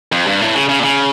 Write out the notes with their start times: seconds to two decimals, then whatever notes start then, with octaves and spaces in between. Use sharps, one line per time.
0.12 F2
0.27 G2
0.41 A2
0.55 C#3
0.69 C#3
0.79 A#2
0.84 C#3